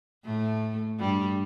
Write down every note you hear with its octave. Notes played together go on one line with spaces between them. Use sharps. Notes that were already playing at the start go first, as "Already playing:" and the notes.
A2 A3
G2 G3